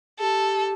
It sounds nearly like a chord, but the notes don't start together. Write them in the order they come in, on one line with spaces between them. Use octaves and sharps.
G#4 A4 G4